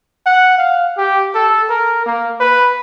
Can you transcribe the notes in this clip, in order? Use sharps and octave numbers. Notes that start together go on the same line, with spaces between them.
F#5
F5
G4
A4
A#4
A#3
B4